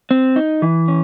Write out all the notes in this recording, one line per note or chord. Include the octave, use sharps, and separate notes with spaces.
C4
D#4
E3
C#4